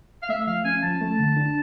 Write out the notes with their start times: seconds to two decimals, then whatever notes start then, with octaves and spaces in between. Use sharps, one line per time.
0.23 F5
0.29 A3 E5
0.47 F3 F5
0.65 C#4 G#5
0.83 F3 A5
1.01 A3
1.19 D3
1.37 D4